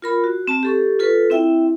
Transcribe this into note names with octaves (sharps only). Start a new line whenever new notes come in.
F4 A#4 B5
F#4
C4 A5
G4 A4 C#6
F4 A4 B4
C4 E4 E5 G5